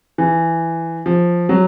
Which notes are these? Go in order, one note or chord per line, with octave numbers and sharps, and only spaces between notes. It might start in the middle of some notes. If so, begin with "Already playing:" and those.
E3
F3
F#3